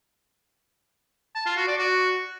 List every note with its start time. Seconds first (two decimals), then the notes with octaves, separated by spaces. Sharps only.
1.35 A5
1.46 F4
1.57 F#4
1.68 D5
1.78 F#4